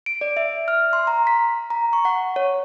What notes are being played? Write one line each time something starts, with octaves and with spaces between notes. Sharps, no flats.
D7
D5
E5
F6
C6
A#5
B6
A#5
C#6
F#5
C#5